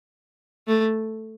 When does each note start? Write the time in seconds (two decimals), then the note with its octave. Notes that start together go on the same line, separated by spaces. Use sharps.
0.67 A3